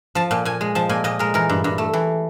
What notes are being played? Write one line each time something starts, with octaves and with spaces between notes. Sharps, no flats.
F3 A5
A#2
A#2 G#5
G#3
F3 A5
A#2 G#5
A#2 D#5
G#3 A#4
E3 A#4
G2
G2
A3
E3